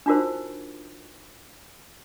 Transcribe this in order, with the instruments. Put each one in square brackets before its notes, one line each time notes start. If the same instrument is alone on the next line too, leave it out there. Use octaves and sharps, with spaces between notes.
[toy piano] D4 D#4 F4 F#4 A#4 C5